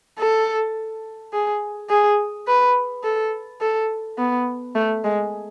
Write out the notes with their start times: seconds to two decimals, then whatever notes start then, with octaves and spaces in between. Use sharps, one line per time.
0.19 A4
1.33 G#4
1.90 G#4
2.48 B4
3.04 A4
3.61 A4
4.18 B3
4.75 A3
5.05 G#3